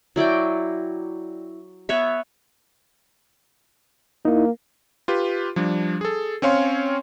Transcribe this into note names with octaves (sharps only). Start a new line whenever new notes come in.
F#3 E4 D5 G5
B3 B4 C#5 E5
A#3 D#4 E4
F4 G4 B4
F3 G3 D4
G#4 A4
C4 C#4 C#5 F5 C6